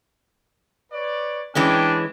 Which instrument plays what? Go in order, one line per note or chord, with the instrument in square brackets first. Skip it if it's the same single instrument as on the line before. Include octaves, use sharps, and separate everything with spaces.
[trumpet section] B4 C#5 D5
[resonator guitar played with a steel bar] E3 G#3 C#4 [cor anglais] D4 [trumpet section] G5